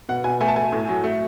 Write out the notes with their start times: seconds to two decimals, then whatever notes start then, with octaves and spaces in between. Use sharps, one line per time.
0.09 B2 F#5
0.24 B2 G#5
0.41 A3 G#5
0.48 A5
0.56 A3 G#5
0.72 A2
0.89 F#3
1.04 A3